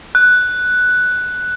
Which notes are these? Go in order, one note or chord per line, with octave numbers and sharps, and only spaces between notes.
F#6